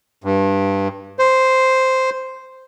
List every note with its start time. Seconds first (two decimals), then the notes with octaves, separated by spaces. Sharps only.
0.24 G2
1.19 C5